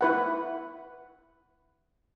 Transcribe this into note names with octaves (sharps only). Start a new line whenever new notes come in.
E4 B4 F#5